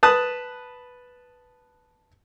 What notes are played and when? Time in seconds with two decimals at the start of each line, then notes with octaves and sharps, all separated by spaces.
0.03 B4 A5 D#6 F#6